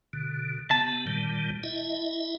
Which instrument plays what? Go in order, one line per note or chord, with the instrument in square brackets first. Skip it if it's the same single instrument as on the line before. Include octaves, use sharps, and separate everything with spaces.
[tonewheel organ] B2 D3
[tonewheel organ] C3 B3 [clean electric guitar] A5
[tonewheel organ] A#2 D#3 G3
E4 D#5 E5